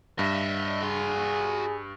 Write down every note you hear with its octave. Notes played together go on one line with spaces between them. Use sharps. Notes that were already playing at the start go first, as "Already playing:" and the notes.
G2 D#5 E5
F#4 G#4 C6